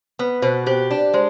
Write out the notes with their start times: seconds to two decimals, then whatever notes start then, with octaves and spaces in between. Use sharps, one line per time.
0.19 B3 B4
0.42 B2 C5
0.66 G4 C5
0.91 D4
1.14 G#3 C5